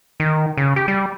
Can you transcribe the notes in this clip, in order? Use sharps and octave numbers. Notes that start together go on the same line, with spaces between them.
D#3
C#3
G4
G3